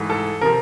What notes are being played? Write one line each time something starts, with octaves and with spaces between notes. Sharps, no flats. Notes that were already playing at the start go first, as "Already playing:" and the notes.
Already playing: G#2 E3 A3
A4
C3 F3 A#4